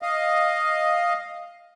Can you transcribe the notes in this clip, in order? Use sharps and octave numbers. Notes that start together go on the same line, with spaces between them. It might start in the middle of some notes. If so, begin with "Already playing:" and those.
D#5 F5